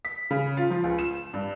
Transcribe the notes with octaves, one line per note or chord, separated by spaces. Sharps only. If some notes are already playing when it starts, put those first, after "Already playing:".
B6
C#3
F4
F3
C#2
E7
G2